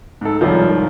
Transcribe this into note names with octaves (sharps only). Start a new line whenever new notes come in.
G#2 A4
F#1 C2 G#2 D#3 F3